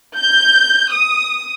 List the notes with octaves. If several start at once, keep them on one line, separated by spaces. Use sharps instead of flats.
G6
D#6